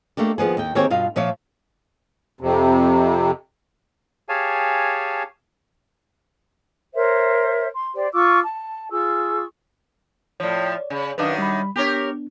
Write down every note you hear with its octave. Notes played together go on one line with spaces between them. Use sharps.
A3 A#3 D4 G4
D#2 F3 B3 G#4
D#2 G5
D#3 A#3 C4 G4 G#4 C#5
G2 B2 F4 F5
A#2 F3 F4 C#5 E5 F5
F2 C3
G4 G#4 C#5 F5 G#5 A5
A#4 C5 C#5 E5
C6
G4 C5 D5
F4 C#6 D6 E6
A5
F4 G#4 C#6 E6
A2 F3 C#5 D5
C#3
F#2 D#3 D4 B4 F5 D#6
G3 B5
B3 D4 G4 A#4 C#5